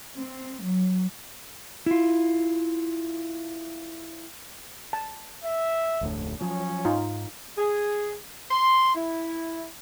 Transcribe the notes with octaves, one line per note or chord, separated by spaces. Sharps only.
C4
F#3
E4 F4
A5
E5
F1 D2 A2
F3 F#3 C#4
G#2 D#4 F4
G#4
C6
E4